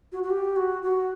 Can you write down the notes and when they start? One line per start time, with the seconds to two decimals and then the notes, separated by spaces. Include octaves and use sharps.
0.12 F#4
0.23 F#4
0.30 G4
0.56 F#4
0.83 F#4